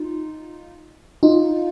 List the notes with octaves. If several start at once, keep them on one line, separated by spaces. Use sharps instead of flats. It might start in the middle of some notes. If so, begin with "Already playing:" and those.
Already playing: D#4 F4
D#4 F4